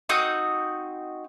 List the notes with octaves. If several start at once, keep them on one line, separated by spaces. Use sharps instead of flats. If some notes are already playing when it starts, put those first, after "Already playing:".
C4 D#4 F#4 D#6